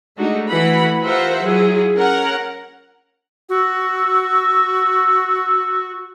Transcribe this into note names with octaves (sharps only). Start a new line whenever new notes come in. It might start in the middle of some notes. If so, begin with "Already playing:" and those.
G#3 A3 D4 D#4 F#4
E3 A3 F#4 F#5 B5
F4 G4 A#4 C5 E5 F#5
F#3 E4 F4 G#4
C#4 A#4 F#5
F#4 E6